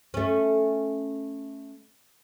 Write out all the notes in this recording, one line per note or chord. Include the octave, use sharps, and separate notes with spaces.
A3 C#4